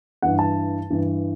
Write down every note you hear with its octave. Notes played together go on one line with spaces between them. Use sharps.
G2 E3 F#5
A5
G2 E3